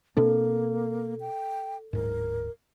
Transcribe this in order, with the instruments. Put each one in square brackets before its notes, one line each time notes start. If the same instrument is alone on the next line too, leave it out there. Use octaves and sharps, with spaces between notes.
[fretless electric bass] B2 C4 D4 [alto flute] A#3 [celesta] A4
[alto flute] G5
[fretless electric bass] D1 G#2 [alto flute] A#4